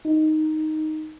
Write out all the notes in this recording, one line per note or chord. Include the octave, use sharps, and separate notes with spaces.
D#4